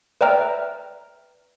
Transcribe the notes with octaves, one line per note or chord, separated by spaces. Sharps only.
B4 D5 E5 G5 A#5 F6